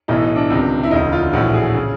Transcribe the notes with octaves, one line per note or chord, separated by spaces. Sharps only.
B1 A2 E3 D#4
D#4
D4
C#2 C3 D#3
E4
E1 D2 C#3 D#4
F4
A#1 A2 E3 F#4
G#4
C#3